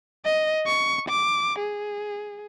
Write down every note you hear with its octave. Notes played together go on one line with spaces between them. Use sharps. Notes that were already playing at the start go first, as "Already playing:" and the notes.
D#5
C#6
D6
G#4